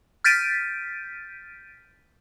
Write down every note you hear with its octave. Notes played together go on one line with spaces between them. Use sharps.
F6 G6 A6 B6 D7 D#7